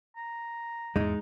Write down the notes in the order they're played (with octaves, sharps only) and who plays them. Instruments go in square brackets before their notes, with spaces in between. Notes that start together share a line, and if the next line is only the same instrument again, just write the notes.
[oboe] A#5
[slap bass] E2 G#2 [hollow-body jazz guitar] G#3 D#4